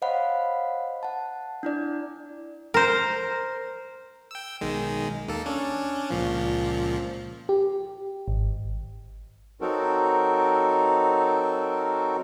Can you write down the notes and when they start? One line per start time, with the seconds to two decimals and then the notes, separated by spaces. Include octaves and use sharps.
0.02 C5 C#5 D#5 F5 F#5 B5
1.03 F#5 A5
1.63 D4 E4 D5
2.74 A#4 C5
4.31 G5 E6
4.61 B1 D#3 G#3
5.28 D#2 A#3 A4
5.46 C#4 D4
6.10 C#2 A#2 F3
7.49 G4
8.28 G#1
9.61 F#3 C4 D#4 F#4 A4 A#4